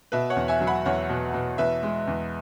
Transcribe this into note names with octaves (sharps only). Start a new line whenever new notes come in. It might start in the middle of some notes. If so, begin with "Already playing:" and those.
B2 B4 E5
C#5 F#5
E2
E5 G#5
F#3
F#5 B5
E2 C#5 F#5
B2
B2
E2 B4 E5
G#3
E2